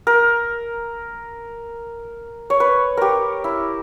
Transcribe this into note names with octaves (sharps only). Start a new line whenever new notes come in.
A#4
C#5
B4
G4 A#4
E4